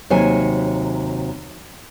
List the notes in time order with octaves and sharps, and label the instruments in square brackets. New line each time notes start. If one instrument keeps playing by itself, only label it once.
[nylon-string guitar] D#2 C3 F#3 C5 C#5 G#5